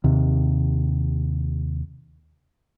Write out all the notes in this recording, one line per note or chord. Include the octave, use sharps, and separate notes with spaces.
D#2 C3